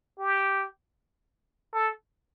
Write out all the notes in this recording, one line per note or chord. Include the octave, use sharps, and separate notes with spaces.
G4
A4